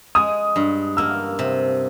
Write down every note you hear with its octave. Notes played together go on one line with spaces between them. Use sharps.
G#3 D#6
G2
A#3 E6
C3